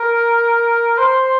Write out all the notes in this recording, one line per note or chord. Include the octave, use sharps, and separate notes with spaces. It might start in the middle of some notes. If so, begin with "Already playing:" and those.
Already playing: A#4
C5